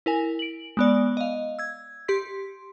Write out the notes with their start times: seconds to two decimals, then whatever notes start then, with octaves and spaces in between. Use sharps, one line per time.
0.06 E4 A#4 G#5
0.39 D7 F#7
0.77 G#3 B3 D5
1.17 D#5 F5
1.59 E6 G#6
2.08 G4 C6 B6